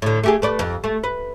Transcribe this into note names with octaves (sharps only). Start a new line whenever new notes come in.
A2 D3
A3 G4 G#4
A3 B4 D5
F2
A3
B4